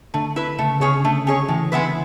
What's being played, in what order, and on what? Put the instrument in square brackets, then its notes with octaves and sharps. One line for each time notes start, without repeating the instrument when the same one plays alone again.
[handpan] D3 [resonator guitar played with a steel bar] A3
[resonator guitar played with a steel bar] E4 B4
[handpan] C#3 [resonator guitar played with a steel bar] A3
[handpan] C#3 [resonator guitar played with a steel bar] C#4 G#4 C#5
[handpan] D3 [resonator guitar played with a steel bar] A3
[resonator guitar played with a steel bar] C#4 G#4 C#5
[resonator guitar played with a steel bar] A2 [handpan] E3
[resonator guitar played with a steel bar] G#3 B3 E4 B4